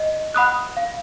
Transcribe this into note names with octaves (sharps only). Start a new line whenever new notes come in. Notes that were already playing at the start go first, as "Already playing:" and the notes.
Already playing: D#5
F#5 B5 D#6 F#6
F5